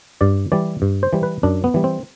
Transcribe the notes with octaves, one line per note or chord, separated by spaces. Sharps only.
G2 D5
E3 G3 D5
G2
C5
E3 G3
B4
F#2 D4
B3
E3 G3
C4